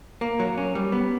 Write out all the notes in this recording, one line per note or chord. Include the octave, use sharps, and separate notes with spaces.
A#3
F#3
C#4
G3
B3